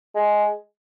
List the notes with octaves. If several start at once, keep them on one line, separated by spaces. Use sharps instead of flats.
G#3